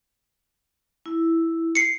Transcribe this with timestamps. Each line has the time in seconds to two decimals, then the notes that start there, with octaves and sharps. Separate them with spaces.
1.06 E4
1.75 C7 C#7